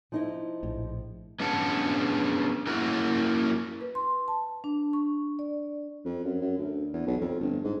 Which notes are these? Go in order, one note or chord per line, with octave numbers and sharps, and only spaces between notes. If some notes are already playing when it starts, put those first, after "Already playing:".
F3 D#4 E4
A#1 A2
B3 C#4 D4 G#4 F#5 A5
A#3 C#4 E4 F#4 A#4
B4
C6
A5
D4
C#6
D5
F2
F#2
F#2
D2
E2
B1
F2
G1
G#2